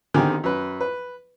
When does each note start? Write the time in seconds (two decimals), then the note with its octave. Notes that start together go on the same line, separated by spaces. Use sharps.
0.14 B1 D3 D#3 C4 G4 G#5
0.44 F#2 B4
0.81 B4